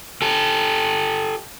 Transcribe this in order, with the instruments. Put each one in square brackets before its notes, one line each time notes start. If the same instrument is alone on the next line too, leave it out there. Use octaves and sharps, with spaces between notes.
[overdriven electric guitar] G4 A4